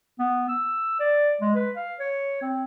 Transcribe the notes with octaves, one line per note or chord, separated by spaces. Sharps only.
B3
E6
D5
G#3
B4
F5
C#5
C4